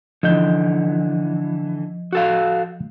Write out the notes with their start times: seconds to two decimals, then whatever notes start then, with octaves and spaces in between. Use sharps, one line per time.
0.23 D3 E3 F3 D#5 G6
2.13 F#4 A4 F5